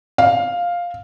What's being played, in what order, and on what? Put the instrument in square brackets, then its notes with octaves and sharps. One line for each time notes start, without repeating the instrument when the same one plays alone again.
[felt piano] F5